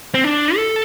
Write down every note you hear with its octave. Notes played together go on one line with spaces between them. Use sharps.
C4
D4
A4